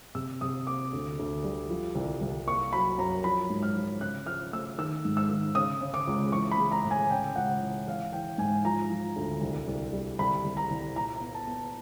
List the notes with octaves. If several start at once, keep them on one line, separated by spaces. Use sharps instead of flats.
C3 E6
C3 D#6
A#3 D6
D2
D2
G3
F3
C2
C2
A#3 C#6
F#3 B5
F#2 A#5
F3 B5
G#2
F6
F3
C#3 F#6
F3 F6
A3 E6
D#3 E6
G#2
E6
D#3
C#3 D#6
C#3
D6
C#2
E3 C#6
B5
G#3
A#5
A2
G#5
C#3 G5
C#2 F#5
E3
E3 F5
E3 G5
G#2 G#5
F3 A#5
F3
D2
C2
C2
G3
C2 B5
C2
A#5
C2
A#2 A#5
A#5
B3
A5
B3